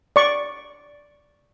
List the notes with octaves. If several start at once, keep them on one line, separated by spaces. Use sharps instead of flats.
D5 C#6